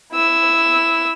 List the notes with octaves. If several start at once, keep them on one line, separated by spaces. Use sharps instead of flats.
E4 E6